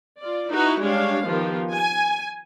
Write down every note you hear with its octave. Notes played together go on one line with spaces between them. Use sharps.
F4 D5
D#4 E4 F#4 B4
G3 G#3 D4 G4 C#5 F5
D#3 F3 B3 F4 G4
G#5